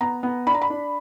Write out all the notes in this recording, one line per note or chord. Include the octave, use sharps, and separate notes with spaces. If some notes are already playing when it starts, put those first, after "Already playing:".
B3 A#5
B3
D4 B5
A#5
B5
D4